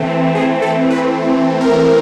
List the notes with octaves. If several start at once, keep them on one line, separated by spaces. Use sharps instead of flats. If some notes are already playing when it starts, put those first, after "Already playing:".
Already playing: E3 A3 C4
G#4
A4
B4
A#4